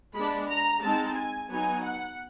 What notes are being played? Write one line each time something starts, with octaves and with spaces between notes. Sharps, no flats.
G#3 B3 D4 B5
A#5
G#3 C4 D#4 A5
G#5
F#3 B3 D#4 G#5
F#5